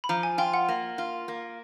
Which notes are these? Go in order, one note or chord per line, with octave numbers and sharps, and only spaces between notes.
B5
F3 A#5
G#5
F4 G5
F#5
A#3
F4
A#3